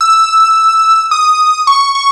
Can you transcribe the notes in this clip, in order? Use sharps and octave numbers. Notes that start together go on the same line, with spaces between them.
E6
D#6
C#6
C#6